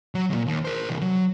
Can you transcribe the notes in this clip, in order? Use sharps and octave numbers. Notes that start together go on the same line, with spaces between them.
F#3
D#2 A#2
D#2
A#4 C5
C3 E3
F#3